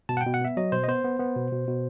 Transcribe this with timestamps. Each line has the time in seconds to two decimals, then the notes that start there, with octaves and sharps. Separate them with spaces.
0.09 B2 A5
0.17 F#5
0.21 G5
0.26 B2
0.34 F#5
0.41 B3 E5
0.57 F#3 D#5
0.72 B2 C5
0.84 D#5
0.88 B3 C5
1.04 B3
1.20 B3
1.36 B2
1.52 B2
1.68 B2